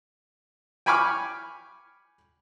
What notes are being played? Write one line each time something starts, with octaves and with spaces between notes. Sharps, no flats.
G5 G#5 B5 C#6 D6 F6